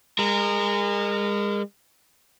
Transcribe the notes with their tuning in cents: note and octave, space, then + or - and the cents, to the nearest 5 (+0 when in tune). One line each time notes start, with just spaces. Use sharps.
G#3 -35 A#4 -15